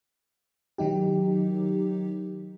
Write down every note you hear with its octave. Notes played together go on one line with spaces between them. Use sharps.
D#3 F#3 D#4 G4